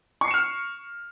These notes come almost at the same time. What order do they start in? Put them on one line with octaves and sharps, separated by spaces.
C#6 C7 C#7 E7 F6